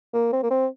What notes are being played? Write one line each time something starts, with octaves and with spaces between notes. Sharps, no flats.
A#3
C4
A#3
C4